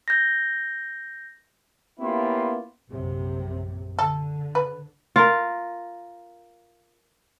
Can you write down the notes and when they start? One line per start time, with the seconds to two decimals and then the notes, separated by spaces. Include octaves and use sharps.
0.08 G6 A#6
2.00 A#3 B3 C#4 E4 F4 G4
2.88 A#1 F#2 C3
3.99 D3 A4
4.55 B4
5.16 F4 A#4